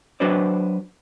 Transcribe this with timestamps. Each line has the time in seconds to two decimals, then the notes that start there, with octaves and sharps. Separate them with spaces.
0.20 F#3 D4 F#4 B4 C5 D5